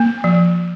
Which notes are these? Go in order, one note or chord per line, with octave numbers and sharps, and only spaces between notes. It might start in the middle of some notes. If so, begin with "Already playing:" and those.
Already playing: A#3
F3